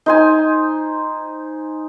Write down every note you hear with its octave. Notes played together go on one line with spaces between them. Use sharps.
D#4 C5 G#5